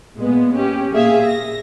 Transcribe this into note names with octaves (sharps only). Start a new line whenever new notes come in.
A#2 G#3 B3
C#4 G4
A#2 G#4 E5 F5
A#6